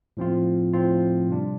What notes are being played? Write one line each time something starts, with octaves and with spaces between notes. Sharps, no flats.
A2 F3 C4 F4
A2 F3 C4 F4
C3 G3 D4